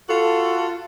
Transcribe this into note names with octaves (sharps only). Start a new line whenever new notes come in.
F4 F#4 A4